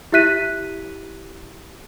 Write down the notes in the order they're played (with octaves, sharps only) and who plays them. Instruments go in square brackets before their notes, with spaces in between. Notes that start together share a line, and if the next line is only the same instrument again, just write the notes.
[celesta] E4 G4 E5 F#6 B6 D#7